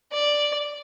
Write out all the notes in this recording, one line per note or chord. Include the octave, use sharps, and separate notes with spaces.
D5